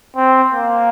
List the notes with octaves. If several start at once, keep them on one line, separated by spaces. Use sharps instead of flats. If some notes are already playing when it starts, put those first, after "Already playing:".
C4
A#3